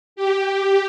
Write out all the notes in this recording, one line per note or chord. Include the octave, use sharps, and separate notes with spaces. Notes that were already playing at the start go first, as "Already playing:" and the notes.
G4